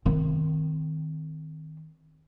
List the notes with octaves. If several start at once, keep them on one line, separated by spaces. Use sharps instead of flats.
D#3 C4